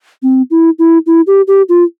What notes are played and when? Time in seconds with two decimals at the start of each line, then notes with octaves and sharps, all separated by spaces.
0.23 C4
0.51 E4
0.79 E4
1.06 E4
1.27 G4
1.48 G4
1.69 F4